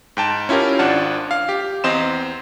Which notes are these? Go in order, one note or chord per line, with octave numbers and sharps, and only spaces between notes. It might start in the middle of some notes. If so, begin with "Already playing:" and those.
G#2 G5 A5
C#4 E4 F4 G4 A#4
G#1 D4 F4 F#5 A5
F5
G4
E2 C4 D#5 C6 E7